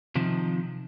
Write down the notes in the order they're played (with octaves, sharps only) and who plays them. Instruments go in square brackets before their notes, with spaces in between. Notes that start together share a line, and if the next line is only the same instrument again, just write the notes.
[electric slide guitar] C3 D#3 F3